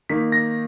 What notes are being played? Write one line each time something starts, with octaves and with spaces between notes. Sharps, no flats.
D#3 A#3 D#4 B6
A#6